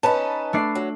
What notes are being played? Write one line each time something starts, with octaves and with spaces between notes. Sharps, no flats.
C#4 D#4 B4 A5
A3 D4 C7
F#3